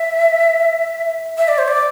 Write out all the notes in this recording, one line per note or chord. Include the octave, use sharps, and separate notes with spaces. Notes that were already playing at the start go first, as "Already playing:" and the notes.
Already playing: E5
E5
D5
C5
D5